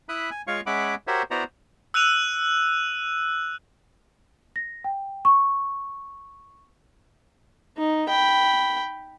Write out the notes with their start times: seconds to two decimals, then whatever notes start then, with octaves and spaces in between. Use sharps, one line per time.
0.09 E4 E5 B5 D#6 F#6
0.31 G#5
0.47 G#3 F4 C#5 F5 C#6
0.66 G#3 C#4 E5 F#5 B5 D6
1.07 F#4 G4 A#4 C5 C#5 E5
1.31 B3 E4 F#4 C5 D5 A#5
1.94 E6 F#6 D#7 F7
4.56 A#6
4.84 G5
5.25 C#6
7.78 D#4
8.09 G5 B5